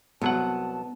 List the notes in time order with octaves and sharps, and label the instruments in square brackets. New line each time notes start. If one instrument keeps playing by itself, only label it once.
[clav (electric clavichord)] C2 F#3 F#5 [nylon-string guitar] B3 [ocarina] A5